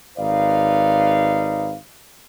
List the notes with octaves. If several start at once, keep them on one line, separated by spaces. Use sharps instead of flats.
G#1 D#4 B4 D5 F5